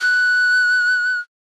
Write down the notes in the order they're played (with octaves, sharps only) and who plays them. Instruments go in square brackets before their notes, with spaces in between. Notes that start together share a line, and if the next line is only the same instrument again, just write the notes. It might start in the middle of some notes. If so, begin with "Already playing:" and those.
[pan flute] F#6